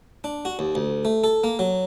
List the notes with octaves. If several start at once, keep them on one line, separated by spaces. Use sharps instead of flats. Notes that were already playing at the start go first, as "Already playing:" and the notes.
D4
F#4
D#2
D2
A3
A4
A#3
F#3